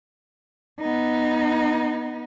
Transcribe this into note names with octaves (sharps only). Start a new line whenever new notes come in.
B3 D#4